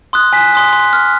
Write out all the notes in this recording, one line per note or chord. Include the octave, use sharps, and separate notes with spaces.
C6 D#6 F#6
G#5 B6
C6 D#6 F#6
C6
F6